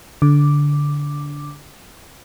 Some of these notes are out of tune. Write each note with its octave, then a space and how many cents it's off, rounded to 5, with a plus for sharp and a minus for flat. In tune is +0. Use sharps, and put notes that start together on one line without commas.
D3 -15 D6 +0